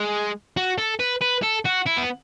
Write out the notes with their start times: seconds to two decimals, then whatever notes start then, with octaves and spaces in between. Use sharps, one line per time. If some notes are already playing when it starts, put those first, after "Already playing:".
Already playing: G#3
0.57 F#4
0.78 A4
1.00 B4
1.22 B4
1.43 A4
1.66 F#4
1.87 E4
1.98 B3